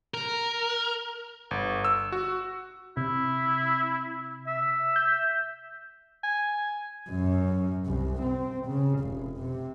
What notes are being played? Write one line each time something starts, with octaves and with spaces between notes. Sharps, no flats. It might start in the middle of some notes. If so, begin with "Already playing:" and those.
A#4
G1
E6
F#4
C3 E4
E5
G6
G#5
F#2
C2
C4
C#3
F1
C3